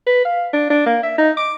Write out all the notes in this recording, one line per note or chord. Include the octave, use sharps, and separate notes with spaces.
B4
F5
D4
D4
A#3
E5
D#4
D6